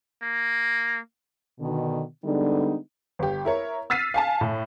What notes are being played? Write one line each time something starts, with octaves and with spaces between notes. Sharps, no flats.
A#3
B2 D3 D#3
D3 G3 G#3 B3 D4 D#4
G1 G4
E4 A#4 C#5
E6 F6 A6 B6 C7 D#7
F5 G#5 A5
A2